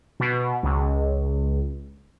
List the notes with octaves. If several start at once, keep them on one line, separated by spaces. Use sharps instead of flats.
B2
C#2